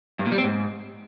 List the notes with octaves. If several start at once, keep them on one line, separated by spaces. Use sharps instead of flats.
G2
A#2
G3
C4
G#2